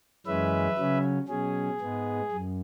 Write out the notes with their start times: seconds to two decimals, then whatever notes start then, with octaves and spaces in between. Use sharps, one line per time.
0.26 F#2 E3 G#3 C#4 B4 E5
0.78 C#3 F#3 C#4
1.28 B2 F#3 C#4 G#4
1.80 G#2 G#3 B3
2.32 F#2